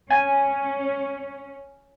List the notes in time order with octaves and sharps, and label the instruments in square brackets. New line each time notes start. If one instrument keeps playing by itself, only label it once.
[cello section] C#4 [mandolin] G#5